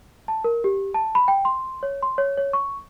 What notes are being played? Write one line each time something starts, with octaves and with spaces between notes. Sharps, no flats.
A5
A#4
G4
A5
B5
G5
C6
C#5
C6
C#5
C#5
C#6